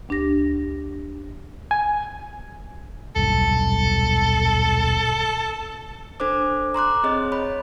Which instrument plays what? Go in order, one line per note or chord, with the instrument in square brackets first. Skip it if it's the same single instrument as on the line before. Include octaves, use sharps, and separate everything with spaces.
[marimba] D2 D4 G4 A#6
[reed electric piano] G#5
[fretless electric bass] D#1 B1 G2 [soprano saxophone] A4
[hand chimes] D4 A4 C5 D6
A#5 C6 D6 F#6
C4 G#4 C#5 D#5
C#5 B5